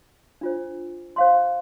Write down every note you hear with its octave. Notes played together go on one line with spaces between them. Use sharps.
D4 F4 C5
C5 F5 C6